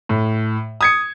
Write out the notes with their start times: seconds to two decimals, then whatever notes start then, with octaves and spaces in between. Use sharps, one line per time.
0.09 A2
0.81 D#6 G#6 C#7